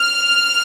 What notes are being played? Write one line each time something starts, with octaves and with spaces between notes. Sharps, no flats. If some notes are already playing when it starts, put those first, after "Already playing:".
Already playing: F6